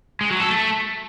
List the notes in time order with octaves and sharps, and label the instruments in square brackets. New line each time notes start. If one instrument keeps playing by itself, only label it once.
[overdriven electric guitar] G#3
F#3
A4
A3